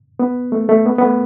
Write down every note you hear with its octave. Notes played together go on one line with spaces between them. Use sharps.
B3
A3
A3
B3
B3
A3